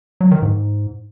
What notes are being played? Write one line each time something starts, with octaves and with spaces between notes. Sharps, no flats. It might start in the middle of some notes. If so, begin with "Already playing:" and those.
F#3
D#3
G#2